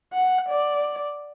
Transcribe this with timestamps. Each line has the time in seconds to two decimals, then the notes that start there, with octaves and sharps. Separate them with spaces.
0.13 F#5
0.49 D5